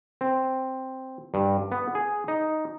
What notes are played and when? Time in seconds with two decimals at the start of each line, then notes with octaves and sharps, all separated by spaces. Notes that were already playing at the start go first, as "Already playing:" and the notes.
0.21 C4
1.34 G2
1.72 B3
1.95 G#4
2.28 D#4